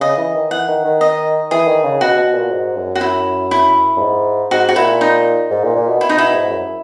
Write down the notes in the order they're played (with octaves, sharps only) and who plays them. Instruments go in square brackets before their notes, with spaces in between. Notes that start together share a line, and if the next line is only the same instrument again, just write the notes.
[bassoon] C#3 [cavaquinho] D#5
[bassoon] E3
D#3
[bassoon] E3 [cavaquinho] F#5
[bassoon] D#3
D#3
[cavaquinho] D#5
[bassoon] E3 [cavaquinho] G#4
[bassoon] D#3
C#3
[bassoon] B2 [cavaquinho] F#4
[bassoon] B2
A#2
G#2
F#2
[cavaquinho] F#4
E4
E4
[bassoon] F#2
G#2
[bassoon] G#2 [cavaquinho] F#4
[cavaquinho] F#4
[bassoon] G#2
[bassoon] A#2 [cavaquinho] E4
[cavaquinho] D#4
[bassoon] G#2
A#2
A#2
B2
[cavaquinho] E4
D#4
[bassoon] B2 [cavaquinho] E4
[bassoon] G#2
F#2